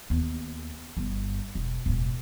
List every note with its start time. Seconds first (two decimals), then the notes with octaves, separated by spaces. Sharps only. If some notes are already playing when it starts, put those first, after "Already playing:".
0.10 D#2 B3
0.97 G1 B3
1.55 E1
1.86 E1 A2